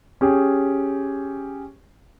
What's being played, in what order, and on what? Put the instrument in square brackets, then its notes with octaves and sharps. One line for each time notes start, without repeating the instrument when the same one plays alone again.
[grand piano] C#4 G4 G#4